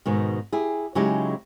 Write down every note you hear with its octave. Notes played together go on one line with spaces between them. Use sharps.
G#2 B2 D#3
E4 G4 G#4
C#3 F#3 G#3 D#4 E4 G4